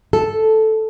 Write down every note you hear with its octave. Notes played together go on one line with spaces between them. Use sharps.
A4